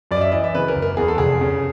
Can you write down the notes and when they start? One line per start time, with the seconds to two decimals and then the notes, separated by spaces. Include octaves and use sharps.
0.11 F#2 D5
0.17 D#5
0.21 E5
0.32 E3 D#5
0.44 E5
0.54 C#3 B4
0.68 A#4
0.75 F#1
0.82 A#4
0.97 E2 G#4
1.08 A4
1.18 F1 G#4
1.41 C#3